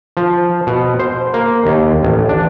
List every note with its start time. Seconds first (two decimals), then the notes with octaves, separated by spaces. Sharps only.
0.17 F3
0.67 B2
0.99 C5
1.34 A#3
1.65 D#2
2.03 A1
2.29 D4